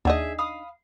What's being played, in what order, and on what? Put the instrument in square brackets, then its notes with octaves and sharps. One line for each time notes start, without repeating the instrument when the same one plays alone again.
[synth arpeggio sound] D#2 F#5 [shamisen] D4 D#4 D#5 [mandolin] G#4 E5 G#5
[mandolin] F5 B5 D#6